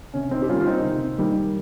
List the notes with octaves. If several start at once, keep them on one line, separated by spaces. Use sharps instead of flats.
C3 C#4
C4 D#4
G4
D#3 G3 A#3 C#4 F4
F4
C4 D#4
C3
D#3 G3 A#3